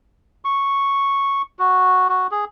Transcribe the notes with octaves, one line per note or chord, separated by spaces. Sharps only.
C#6
F#4
F#4
G#4